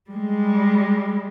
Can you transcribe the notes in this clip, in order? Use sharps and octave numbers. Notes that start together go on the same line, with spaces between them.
G3 G#3